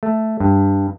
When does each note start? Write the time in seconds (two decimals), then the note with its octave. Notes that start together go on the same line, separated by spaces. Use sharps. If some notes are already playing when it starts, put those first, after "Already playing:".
0.03 A3
0.40 G2